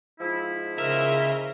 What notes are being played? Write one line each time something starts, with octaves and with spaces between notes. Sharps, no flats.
G#2 F3 E4
C#3 A#4 C5 D#5 E5